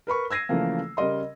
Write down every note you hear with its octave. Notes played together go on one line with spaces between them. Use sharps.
A#4 B4 B5 C#6
E6 G#6 A#6 C7 D#7
C#3 E3 F3 A3 A#3
C#3 G3 A#4 D#5 C6